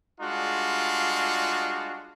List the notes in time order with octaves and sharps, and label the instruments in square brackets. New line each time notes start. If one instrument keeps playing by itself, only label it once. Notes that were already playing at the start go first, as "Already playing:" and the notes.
[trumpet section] G3 G#3 D4 F4 F#4